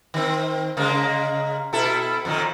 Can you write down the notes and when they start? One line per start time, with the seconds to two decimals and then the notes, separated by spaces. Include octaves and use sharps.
0.14 D#3 C4
0.77 C#3 G#3 A#3
1.73 B2 E4 A4
2.25 F2 A#2 D#3